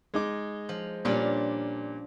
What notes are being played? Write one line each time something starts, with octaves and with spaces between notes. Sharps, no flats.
G#3 D#4 D6
F3
A#2 G3 C#4 D4 F4